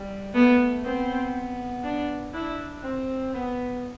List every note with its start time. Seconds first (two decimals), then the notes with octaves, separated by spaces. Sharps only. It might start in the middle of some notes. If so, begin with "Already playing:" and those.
Already playing: G3
0.34 A3 B3
0.85 B3 C4
1.84 D4
2.34 D4 E4
2.83 C4
3.34 B3